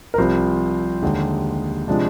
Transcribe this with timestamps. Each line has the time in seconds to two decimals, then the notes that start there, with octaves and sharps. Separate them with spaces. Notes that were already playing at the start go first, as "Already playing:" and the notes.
0.14 A#4
0.18 C2 C3 F3 C5
1.02 D#2 D3 G#3
1.88 C3 F3 G#3 D4